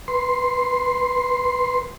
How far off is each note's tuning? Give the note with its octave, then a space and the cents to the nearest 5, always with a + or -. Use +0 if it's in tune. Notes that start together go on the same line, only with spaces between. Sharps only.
B4 +0 C6 +0